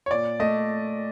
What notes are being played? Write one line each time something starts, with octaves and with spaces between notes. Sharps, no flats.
C#5
A#2 D5
A3 D#5